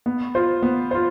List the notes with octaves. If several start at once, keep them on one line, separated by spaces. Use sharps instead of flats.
B3
F4 C5
B3
F4 C5